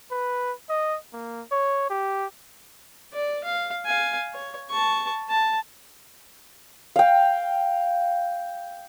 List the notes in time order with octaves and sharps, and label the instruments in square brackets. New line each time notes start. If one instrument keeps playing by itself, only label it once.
[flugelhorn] B4
D#5
A#3
C#5
G4
[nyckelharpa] D5
F5
F5 G#5
C#5
A5 C#6
A5
[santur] F5 G5